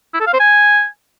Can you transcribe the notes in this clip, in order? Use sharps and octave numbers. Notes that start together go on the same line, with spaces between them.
E4
A4
F5
C5
G#5